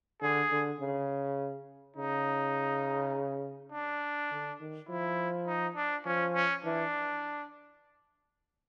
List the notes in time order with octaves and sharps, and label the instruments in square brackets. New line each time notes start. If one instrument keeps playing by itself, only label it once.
[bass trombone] D3 [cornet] G#4
[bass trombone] D3
C#3
[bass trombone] C#3 [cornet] D#4
[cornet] D4
[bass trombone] D3
D#3
[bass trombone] F3 [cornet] E4
[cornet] D#4
D4
[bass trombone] F3 [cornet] C#4
[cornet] C#4
[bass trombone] E3 [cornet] D4